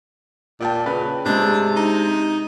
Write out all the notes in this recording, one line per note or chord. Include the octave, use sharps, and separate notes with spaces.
A#2 D5 G5 A5
C#3 B4
C3 G#3 D4
D#4